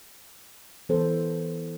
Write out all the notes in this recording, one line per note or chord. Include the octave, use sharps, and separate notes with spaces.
E3 B3 A4 C5